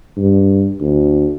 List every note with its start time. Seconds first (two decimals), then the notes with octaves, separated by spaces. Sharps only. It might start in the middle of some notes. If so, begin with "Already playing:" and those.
0.18 G2
0.81 D2